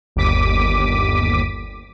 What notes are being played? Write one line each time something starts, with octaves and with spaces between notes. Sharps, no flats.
G1 D#2 D6 B6 D#7